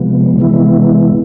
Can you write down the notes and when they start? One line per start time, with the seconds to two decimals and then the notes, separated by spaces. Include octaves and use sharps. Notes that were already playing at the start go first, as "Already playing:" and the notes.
Already playing: C3 F3 G#3 B3
0.38 C3 E3 G#3 B3 E4